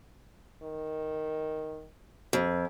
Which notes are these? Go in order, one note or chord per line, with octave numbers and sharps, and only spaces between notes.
D#3
F2